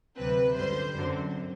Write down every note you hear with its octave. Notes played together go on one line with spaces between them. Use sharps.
D2 C3 F#3 C4 B4
F#2 D3 G3 C5
F#2 D3 F#3 C4